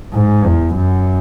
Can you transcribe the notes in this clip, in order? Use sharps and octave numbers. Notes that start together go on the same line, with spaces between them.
G#2
E2
F#2